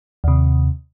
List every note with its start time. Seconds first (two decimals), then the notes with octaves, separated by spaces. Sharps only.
0.24 D#2 C3